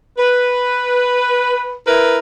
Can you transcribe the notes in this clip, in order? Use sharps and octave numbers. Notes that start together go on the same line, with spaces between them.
B4
E4 A#4 B4